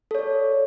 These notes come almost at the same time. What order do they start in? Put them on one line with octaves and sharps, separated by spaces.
A4 C#5 D5